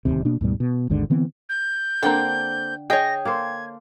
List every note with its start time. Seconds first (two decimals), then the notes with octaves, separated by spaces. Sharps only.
0.05 D1 G1 D#2 C3
0.25 B2 A#3 D4
0.41 D2 G#2 B2 G3
0.60 B2
0.90 G#1 D#2 G#2 D3
1.10 D3 E3 B3 C4
1.49 G6
2.03 D3 A#3 C4 A4 G5
2.90 G#4 C#5 D#5 G5 A#6
3.25 A#3 A4 C5 G#6